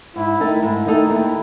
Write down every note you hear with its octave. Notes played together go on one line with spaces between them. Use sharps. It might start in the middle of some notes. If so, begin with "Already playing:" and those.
G#2 E4
D#3 A3 D#4 A4
G#2 E4
D#3 A3 D#4 A4
D#2